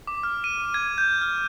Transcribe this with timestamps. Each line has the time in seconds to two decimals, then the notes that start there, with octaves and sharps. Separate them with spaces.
0.07 D6
0.23 F6
0.44 D#7
0.74 G#6
0.98 G6
1.22 F6